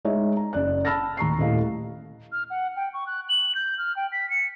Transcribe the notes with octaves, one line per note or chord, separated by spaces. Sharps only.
G#3 D#4 C#5 E5
A#5
F#1 D5 F#6
A5 B5 E6 F6 A6 A#6
D#2 A#5 C#6 C7
D#1 A2 D#5 F5
F6
F#5
G5
C#6
F#6
F#7
G6
F6
G5
B6
C#7